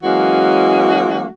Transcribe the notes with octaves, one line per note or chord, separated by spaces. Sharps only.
E3 F#3 G#3 A#3 C#4 F#4